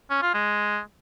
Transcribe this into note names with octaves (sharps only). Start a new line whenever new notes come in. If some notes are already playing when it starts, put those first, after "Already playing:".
C#4
F4
G#3